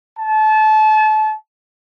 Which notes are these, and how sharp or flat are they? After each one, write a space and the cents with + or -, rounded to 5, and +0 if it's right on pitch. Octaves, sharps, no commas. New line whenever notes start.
A5 -30